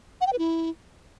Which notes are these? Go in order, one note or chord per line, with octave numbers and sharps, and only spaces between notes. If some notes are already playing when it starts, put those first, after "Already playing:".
F#5
G5
B4
E4